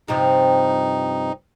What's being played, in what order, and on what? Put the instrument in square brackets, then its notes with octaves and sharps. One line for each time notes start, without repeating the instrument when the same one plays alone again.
[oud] G2 C3 F3 [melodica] D#4